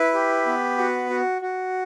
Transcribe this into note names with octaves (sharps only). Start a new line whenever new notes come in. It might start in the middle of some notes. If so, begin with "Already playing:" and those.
Already playing: E4 B4
G4
B3
F#4
F#4
F#4